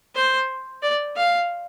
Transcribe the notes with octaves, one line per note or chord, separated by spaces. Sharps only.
C5
D5
F5